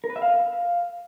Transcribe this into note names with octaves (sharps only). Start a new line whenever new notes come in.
A#4
B4
E5
F5